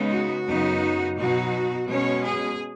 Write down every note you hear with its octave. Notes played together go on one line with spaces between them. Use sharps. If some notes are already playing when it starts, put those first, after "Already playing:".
Already playing: C#3 G#3 B3 D#4
F#4
F#2 C#3 B3 D#4
B2 F#3 D#4 F#4
B2 G#3 C#4 C#5
G#4